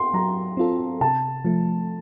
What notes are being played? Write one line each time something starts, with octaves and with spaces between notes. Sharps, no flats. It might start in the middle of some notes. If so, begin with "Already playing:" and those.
Already playing: C6
F#3 A#5
C4 F4 A4
C3 A5
F3 A3